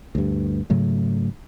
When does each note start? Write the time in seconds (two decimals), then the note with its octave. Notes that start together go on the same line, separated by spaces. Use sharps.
0.15 D2 G2
0.70 G#2 C#3 F#3 A3